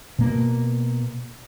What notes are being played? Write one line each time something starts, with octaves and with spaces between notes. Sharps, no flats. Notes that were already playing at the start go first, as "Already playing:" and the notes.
B2 A#3